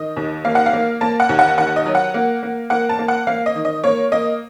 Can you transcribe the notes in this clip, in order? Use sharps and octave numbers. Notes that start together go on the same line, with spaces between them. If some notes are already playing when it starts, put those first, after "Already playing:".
Already playing: D#3 D#5
D#2
A#3 F5
F#5
F5
A#3
A#3 A5
F#5
D#2
F#5
D#3 F#5
D#5
F#3
F#5
A#3
A#3
A#3 F#5
A5
A#3
F#5
A#3 F5
D#5
D#3
D#5
A#3 C#5
A#3 D#5